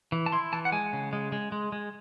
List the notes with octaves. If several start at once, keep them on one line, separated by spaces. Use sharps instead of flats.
E3
A5
E4 C6
E3 A5
F#5
G#3 G#5
C#3
G#3
G#3
G#3
G#3